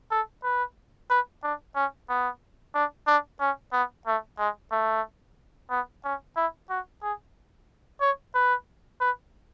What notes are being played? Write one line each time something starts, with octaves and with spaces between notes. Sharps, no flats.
A4
B4
B4
D4
C#4
B3
D4
D4
C#4
B3
A3
G#3
A3
B3
C#4
E4
F#4
G#4
C#5
B4
B4